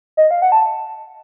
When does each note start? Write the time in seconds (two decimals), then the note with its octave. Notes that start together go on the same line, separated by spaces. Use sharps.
0.17 D#5
0.31 F5
0.42 F#5
0.52 A5